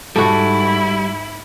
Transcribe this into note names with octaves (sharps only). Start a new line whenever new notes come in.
G#2 G3 E4 F#4 A4